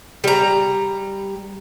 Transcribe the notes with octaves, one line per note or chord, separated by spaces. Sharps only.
G3 A#5